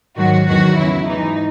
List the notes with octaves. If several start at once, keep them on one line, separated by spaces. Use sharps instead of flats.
G#2 D#3 F#3 F#4
E2 D#3 F#3 F#4
E2 C#3 F#3 E4
G#2 E3 D#4